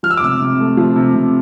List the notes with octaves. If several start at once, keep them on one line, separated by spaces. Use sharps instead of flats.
F3 F6
E6
D6
C3 E6
C3
A3
F3
C3
C3